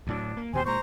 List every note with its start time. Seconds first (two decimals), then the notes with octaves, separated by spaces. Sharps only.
0.07 D2 A2 F#3 D4
0.37 A#3
0.53 D#2 B2 G4 C5 G#5
0.64 A#2 G#3 C5 A#5 C#6